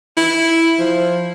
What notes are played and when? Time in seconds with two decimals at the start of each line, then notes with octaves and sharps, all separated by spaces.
0.17 E4
0.79 F3